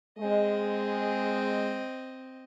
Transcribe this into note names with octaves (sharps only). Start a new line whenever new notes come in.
G#3 C4 D#5